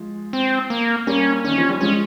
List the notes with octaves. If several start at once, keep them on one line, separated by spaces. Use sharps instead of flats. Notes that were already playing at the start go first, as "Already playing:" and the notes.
Already playing: F3 G#3
C4
A#3
G3 A#3 C#4
D#3 C#4
F3
G3
F3 G#3 C#4